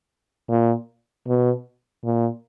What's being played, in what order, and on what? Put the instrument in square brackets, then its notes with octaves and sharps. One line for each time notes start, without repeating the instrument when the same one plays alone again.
[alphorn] A#2
B2
A#2